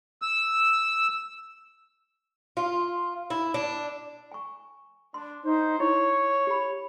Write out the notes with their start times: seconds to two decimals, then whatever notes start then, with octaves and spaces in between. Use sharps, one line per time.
0.22 E6
2.57 F4
3.30 E4
3.54 D4
4.32 G#5 C#6
5.14 D4 C6
5.44 D#4 C5
5.80 E4 C#5 C#6
6.47 G4 B5